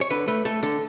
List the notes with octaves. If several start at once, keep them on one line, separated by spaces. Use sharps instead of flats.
C#5
D3 B4
A3 B4
A3 A4
D3 A4